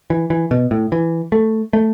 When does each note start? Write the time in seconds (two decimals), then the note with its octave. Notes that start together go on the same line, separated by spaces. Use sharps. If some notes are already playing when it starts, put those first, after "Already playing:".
0.10 E3
0.30 E3
0.51 B2
0.71 A2
0.92 E3
1.32 A3
1.73 A3